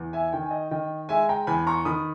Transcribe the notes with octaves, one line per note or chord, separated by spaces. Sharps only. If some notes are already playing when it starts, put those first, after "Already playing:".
Already playing: E2
E5 G#5
D#3 G5
G#5
D#5 G5
D#3 D#5 G5
G#3 E5 G#5
G5 A#5
E2 G#5 B5
A#5 C#6
D#3 B5 D#6